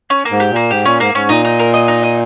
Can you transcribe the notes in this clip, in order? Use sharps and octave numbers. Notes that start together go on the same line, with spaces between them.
C#4
A#3
G#2
G4
A#2
A#3
G#2 G4
A#2 C#4
G#2 A#3
G#2 C#4
A#2 D#4
D#4
A#4
D#5
D#4
D#5